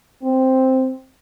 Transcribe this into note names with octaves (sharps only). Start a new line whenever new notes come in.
C4